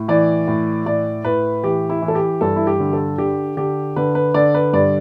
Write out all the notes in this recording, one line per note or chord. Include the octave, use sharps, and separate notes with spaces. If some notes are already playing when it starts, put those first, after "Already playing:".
Already playing: A2
E3 D5
A2
A2 D5
A2 B4
E3 G4
E4
E3
A4
G4
G2 A4
E4
G4
D3
A4
D3 G4
D3 G4
D3 B4
B4
D3 D5
B4
G2 D5